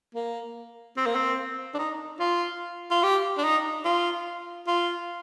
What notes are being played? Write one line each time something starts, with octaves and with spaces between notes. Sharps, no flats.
A#3
C4
A#3
C4
D4
D#4
F4
F4
G4
D4
D#4
F4
F4